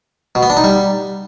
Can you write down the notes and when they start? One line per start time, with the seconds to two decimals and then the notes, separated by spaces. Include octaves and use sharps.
0.35 B2
0.43 B3
0.50 D4
0.57 D#4
0.64 G3